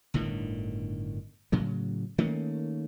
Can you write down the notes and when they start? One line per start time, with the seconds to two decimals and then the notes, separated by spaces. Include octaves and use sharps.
0.14 G1 A2 D3 D#3
1.52 A2 C#3 F#3
2.18 D#3 A3 A#3 C#4